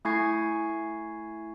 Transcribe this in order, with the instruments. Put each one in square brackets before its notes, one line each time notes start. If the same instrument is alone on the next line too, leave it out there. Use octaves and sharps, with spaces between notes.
[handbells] A3 E4 G#5 C#6 G#6 C7